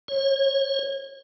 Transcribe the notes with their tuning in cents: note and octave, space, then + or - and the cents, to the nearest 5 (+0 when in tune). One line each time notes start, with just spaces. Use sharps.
C#5 -30